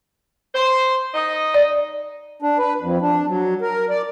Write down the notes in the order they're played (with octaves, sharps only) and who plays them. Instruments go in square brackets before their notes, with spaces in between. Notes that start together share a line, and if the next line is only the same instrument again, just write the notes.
[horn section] C5
D#4 D#5
[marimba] D5
[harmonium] D4
B4
F2
D4
F#3
A#4
D5